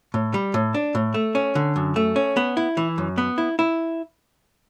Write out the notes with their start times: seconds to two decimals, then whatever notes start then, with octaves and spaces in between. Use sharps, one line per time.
0.14 A2
0.34 G3
0.54 A2
0.74 D4
0.95 A2
1.14 A3
1.35 C#4
1.55 D3
1.76 F#2
1.96 A3
2.16 C#4
2.37 B3
2.57 E4
2.77 E3
2.98 F#2
3.18 B3
3.38 E4
3.59 E4